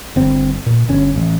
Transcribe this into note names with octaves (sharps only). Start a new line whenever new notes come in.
G1 C4
A#2
G1 C#4
A1